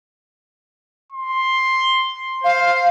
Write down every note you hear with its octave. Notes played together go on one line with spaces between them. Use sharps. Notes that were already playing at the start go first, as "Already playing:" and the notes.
C6
C5 F5